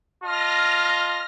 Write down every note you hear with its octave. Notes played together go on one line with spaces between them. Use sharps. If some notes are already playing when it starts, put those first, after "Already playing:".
F4 D#5 A5 F6 A#6